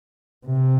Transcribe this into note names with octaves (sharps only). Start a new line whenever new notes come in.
C3